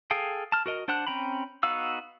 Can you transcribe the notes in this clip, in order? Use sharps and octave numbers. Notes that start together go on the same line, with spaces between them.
G#4 A4 F5 G5
A5 F6
F#4 A#4 D#5
D4 C5 F#5 A5 F#6
C4 C#4 G5 A#5 B5
B3 D#4 F#4 F5 E6